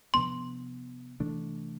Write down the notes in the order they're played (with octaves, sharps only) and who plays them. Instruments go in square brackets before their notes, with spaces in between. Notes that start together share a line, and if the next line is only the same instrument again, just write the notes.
[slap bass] C3 F3 B3 D4 [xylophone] C6
[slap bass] C3 E3 A3 D4